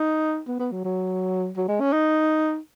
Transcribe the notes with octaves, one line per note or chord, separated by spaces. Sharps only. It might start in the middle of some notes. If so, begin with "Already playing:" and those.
Already playing: D#4
B3
B3
F#3
F#3
F#3
G#3
C#4
D#4